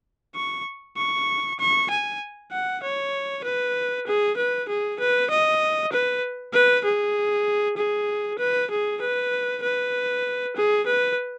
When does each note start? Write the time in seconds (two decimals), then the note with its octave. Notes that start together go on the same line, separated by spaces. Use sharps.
0.35 C#6
0.97 C#6
1.59 C#6
1.90 G#5
2.52 F#5
2.83 C#5
3.44 B4
4.07 G#4
4.37 B4
4.69 G#4
5.00 B4
5.30 D#5
5.92 B4
6.53 B4
6.85 G#4
7.77 G#4
8.39 B4
8.71 G#4
9.01 B4
9.63 B4
10.56 G#4
10.87 B4